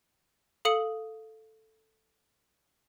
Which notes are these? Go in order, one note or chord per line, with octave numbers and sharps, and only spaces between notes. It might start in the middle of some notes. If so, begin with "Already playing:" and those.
A4 F5 D#6 C#7 F#7